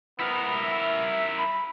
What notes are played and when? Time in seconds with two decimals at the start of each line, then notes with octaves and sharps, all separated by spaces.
0.20 B3 E4 A#4
0.62 E5
1.38 B5